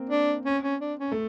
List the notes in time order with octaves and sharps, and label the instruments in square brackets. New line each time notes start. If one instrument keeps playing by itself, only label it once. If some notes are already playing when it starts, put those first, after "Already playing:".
Already playing: [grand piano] A#3 C4
[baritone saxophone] D4
C#4
C#4
D4
C#4
[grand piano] A3